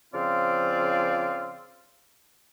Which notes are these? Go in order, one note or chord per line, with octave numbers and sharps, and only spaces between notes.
C#3 F3 C4 F4 D5 F5